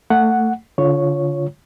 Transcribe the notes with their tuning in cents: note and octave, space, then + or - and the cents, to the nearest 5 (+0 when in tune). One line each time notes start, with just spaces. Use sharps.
A3 +20 F#5 +0
D3 -30 F4 +0 C#5 +0